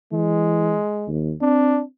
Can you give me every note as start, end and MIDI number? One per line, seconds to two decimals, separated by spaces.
0.12 0.78 52
0.12 1.09 56
1.08 1.33 39
1.41 1.82 60
1.41 1.81 62